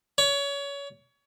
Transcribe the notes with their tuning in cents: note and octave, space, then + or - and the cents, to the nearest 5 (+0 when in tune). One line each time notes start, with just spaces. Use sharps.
C#5 +25